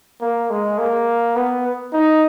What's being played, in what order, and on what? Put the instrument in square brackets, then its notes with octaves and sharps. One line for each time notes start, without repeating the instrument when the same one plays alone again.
[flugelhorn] A#3
G#3
A#3
B3
D#4